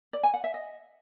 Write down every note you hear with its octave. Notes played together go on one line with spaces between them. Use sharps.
D5
G#5
F#5
E5
D#5